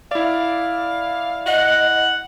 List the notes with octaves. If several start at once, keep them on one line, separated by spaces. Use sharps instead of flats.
E4 D5 F5
D#5 F#5